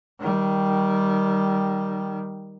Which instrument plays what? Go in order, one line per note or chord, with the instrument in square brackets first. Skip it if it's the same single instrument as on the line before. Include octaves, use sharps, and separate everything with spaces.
[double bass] D#3 G3